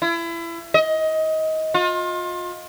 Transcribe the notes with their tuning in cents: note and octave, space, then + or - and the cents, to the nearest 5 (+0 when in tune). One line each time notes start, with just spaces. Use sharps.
E4 +30
D#5 +20
F4 +30